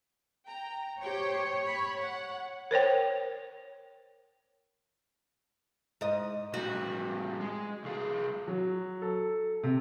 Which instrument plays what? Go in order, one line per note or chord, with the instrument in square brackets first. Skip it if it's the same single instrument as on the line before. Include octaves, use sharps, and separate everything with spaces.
[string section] G5 A#5
[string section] G4 C5 G5 [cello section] C#5
[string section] B5
F#5
[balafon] A#4 C5 C#5 G5
[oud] G#2 D#5
[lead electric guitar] A2 G3 [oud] F#4
[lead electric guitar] G#3
C2 G#4
[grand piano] F#3
A4
C3